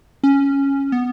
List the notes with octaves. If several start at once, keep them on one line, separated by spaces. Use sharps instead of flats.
C#4
B3